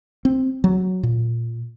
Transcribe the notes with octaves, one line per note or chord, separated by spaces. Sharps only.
C4
F#3
A#2